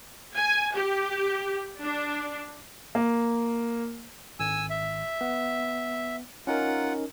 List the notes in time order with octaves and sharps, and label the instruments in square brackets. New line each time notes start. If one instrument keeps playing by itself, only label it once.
[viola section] G#5
G4
D4
[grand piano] A#3
[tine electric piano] G#1 [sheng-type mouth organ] G#5 E6
[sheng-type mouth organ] E5
[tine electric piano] B3
[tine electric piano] C#4 D#4 A#4 [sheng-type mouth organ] F4 F#5